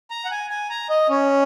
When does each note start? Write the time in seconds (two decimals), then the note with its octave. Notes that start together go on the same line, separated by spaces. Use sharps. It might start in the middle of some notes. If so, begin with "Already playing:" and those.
0.11 A#5
0.25 F#5
0.31 G#5
0.50 G#5
0.70 A#5
0.90 D#5
1.09 C#4